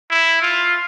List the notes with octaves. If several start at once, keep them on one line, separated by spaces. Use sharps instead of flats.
E4
F4